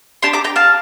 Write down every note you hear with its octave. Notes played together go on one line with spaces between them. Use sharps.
D4 G4 A5 C6
A#5 D6
G5 A#5
F5 A5